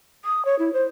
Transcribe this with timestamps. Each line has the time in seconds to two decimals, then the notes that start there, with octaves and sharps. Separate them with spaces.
0.25 D#6
0.45 C#5
0.59 E4
0.73 C5